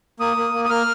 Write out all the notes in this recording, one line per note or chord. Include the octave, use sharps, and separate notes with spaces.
A#3 D#6
A#3
A#3
D#6
A#3 F6